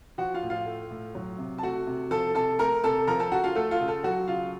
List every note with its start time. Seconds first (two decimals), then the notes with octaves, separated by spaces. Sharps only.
0.18 F3 F#4 F#5
0.34 F4 F5
0.43 A2
0.50 F4 F5
0.66 A3
0.91 A2
1.15 F#3
1.38 C3
1.58 A5
1.63 A3 F#4 F#5
1.87 C3
2.11 F3 A4 A5
2.35 C3 A4 A5
2.59 A3 A#4 A#5
2.84 C3 A4 A5
3.07 F3 A#4 A#5
3.20 A4 A5
3.32 C#3 F#4 F#5
3.44 F4 F5
3.55 A3 A4
3.71 F4 F5
3.80 C#3
3.88 A4 A5
4.04 F#3 F#4 F#5
4.28 C#3 F4 F5